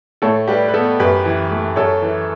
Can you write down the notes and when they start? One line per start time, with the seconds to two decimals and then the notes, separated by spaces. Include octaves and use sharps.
0.22 A2 A4 C#5
0.47 G3 G4 B4
0.68 B4
0.74 B3 A4
0.99 F#2 G4 B4
1.25 E3
1.51 A3
1.76 F#2 A4 C#5
2.02 E3